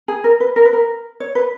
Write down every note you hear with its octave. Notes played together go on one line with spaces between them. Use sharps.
G#4
A#4
B4
A#4
B4
A#4
C#5
B4